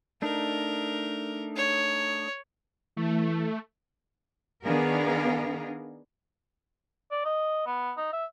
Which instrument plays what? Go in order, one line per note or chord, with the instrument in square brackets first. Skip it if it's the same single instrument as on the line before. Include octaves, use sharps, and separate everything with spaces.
[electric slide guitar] A3 D4 D#4 [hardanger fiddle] A#4
[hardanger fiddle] C#5
[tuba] E3 [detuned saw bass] A3
[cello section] D#3 B3 D4 G#4 A#4 F5
[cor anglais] D5
D#5
B3
D#4
E5